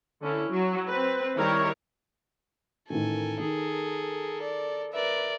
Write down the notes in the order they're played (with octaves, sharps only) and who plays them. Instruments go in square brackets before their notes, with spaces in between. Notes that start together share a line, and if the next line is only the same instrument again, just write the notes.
[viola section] D3 C#4 E4
F#3
C4 B4
D#3 G3 E4 A#4 C#5
[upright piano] A1 D#3 [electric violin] A4 A#4 [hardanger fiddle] G#5
[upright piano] D#3 [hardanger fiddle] G#4
[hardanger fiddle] D5
[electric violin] A#4 D5 [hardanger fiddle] B4 E5